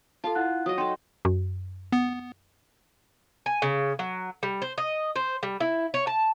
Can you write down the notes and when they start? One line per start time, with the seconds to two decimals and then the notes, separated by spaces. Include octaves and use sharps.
0.24 F4 A4 F5 A5
0.35 E4 F#5 F#6
0.66 F#3 D#5 D#6
0.78 D#4 A4 G5 C6
1.25 F#2
1.92 B3
3.46 G#5
3.62 C#3
3.99 F#3
4.43 G3
4.62 C5
4.78 D#5
5.16 C5
5.43 G3
5.60 E4
5.94 C#5
6.07 A5